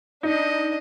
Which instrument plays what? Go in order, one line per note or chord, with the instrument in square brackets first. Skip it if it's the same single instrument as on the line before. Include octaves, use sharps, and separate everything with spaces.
[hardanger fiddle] D4 D#5 [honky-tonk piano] D#4